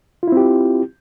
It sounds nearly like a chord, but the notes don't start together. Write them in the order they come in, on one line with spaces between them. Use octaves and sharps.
F4 E4 C4 G4